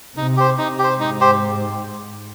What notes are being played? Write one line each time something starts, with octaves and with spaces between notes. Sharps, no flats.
C3 D#4
G4 C5
D#4
G4 C5
G#2 D#4
G4 C5